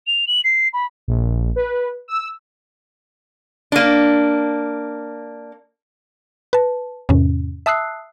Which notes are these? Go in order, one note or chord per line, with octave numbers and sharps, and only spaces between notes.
F7
F#7
C7
B5
A#1
B4
E6
A#3 D4
B4 A5
E2 G#2 C3 C#4
E5 A5 D#6 E6 F#6 C7